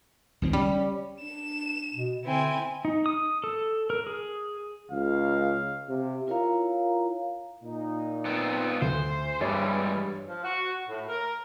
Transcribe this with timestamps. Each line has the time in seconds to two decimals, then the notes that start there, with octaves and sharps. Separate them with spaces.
0.42 C#2 D#3 C4
0.53 G3 C#4
1.20 D4 E7
1.94 B2
2.25 D3 C4 E4 G#5
2.85 D#4
3.06 D#6
3.44 A4
3.90 A#4
4.07 G#4
4.92 C#2 F5
5.89 C3
6.27 E4 F4 A#4 C#5 F5 A#5
7.63 A#2 D#4
8.25 B3 C4 F4
8.82 D2 C5
9.41 G2 E3 G3 G#3 C#5 A6
10.27 F3
10.44 F#4
10.88 A2
11.08 A#4